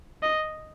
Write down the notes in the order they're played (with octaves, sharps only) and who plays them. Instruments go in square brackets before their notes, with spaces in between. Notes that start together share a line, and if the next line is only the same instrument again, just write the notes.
[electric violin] D#5